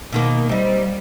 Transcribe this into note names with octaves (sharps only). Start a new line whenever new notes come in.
B2 D#3 A#3
G3 C4 D#4